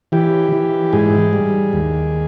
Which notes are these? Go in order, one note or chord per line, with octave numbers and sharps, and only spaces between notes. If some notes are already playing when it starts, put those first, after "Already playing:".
E3 G4
E3
G#2 G#4
G3
D#2